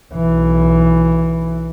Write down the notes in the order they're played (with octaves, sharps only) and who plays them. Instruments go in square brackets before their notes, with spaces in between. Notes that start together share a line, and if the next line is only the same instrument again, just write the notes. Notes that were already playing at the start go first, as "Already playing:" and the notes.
[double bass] B1 E3